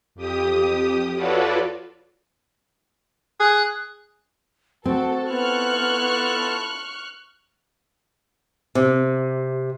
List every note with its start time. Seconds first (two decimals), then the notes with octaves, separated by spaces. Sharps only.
0.15 F2 G4 D#6
1.16 F4 F#4 A4 B4 C#5 D5
3.40 G#4 F#6
4.85 C4 F#4 A4
5.30 B3 E4 F4 A4 C#6 F6 F#6
8.75 C3